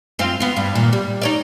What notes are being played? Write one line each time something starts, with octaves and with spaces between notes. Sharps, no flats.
F#2 C4 F4
B3 F4
G2
A#2 D#3
G3
D#4 C#5 D5